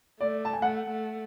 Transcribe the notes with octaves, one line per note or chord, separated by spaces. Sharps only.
A3 D5
A5
G#5
A3 F#5
A3